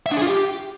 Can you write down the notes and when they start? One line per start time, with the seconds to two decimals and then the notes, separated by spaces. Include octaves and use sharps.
0.06 E5
0.11 D4
0.17 G#4
0.22 F4
0.27 G4